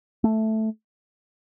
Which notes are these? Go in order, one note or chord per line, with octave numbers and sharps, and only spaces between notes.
A3